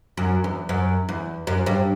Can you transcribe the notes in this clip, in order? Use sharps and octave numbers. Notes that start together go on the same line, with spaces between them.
F#2
E2
F#2
E2
F#2
G2